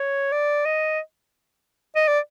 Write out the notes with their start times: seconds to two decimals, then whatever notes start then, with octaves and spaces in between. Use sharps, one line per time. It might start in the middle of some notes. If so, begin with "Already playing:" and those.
Already playing: C#5
0.32 D5
0.66 D#5
1.96 D#5
2.08 D5